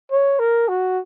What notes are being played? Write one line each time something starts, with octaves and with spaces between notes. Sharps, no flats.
C#5
A#4
F#4